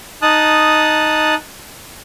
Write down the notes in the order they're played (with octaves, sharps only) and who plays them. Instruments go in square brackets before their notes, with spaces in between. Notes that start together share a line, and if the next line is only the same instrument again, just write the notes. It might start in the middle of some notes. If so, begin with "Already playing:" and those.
[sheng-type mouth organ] D#4 A5 D#6 F#6